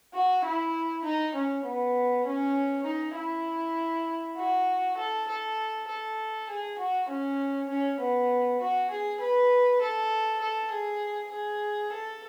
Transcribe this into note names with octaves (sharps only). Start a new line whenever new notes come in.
F#4
E4
D#4
C#4
B3
C#4
D#4
E4
F#4
A4
A4
A4
G#4
F#4
C#4
C#4
B3
F#4
G#4
B4
A4
A4
G#4
G#4
A4